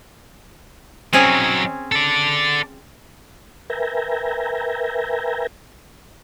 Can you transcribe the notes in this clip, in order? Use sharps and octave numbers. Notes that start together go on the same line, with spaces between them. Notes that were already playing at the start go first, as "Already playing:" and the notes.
F#3 C4 C#4 D#4 G#4
A4 D5
A#4 B4 E5 G5 G#5 A#5